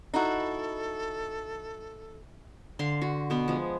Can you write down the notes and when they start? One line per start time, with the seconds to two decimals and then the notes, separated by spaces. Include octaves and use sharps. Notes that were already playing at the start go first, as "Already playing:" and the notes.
0.14 D#4 E4 F#4 A4
2.79 D3 F5 C6
3.02 F#4
3.30 B2 B3
3.48 F3 G#3